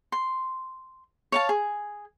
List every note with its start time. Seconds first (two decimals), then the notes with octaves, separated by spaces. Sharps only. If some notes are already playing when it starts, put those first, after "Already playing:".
0.12 C6
1.32 C#5 F5 A5
1.49 G#4